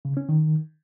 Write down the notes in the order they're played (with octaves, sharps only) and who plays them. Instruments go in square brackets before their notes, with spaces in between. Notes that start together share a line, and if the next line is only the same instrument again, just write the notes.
[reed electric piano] C#3
C#4
D#3